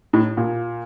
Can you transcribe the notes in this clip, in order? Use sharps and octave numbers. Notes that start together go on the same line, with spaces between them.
A2
A#2